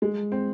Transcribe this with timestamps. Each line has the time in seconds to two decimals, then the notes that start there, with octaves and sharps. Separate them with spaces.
0.02 G#3
0.32 C4